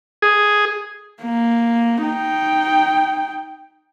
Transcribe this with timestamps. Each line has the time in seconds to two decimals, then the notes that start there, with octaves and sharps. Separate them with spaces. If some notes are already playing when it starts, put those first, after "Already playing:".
0.22 G#4
1.22 A#3
2.03 D#4 G5